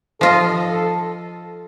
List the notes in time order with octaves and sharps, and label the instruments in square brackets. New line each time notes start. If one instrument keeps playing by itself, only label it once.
[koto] F3 F4 D#5 [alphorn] A4